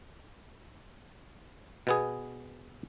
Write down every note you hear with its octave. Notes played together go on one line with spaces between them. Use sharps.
B2 B3 G#4